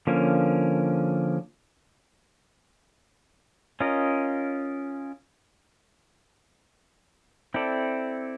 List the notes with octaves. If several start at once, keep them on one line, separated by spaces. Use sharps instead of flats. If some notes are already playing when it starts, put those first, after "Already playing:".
D3 F3 A#3 C#4
C#4 F4 A#4 D#5
C4 E4 A4 D5